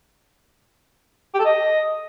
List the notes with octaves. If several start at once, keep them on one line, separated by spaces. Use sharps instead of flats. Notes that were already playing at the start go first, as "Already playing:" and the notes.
G4
A4
D#5